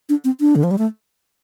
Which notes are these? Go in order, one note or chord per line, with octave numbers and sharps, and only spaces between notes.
D4
C4
D4
D3
F3
G3
A3